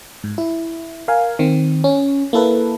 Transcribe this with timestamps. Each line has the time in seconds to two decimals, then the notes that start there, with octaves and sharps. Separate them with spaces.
0.24 G#2
0.38 E4
1.08 A#4 F5 G#5
1.39 D#3 C4
1.84 C#4
2.33 A#3 E4 A4 B4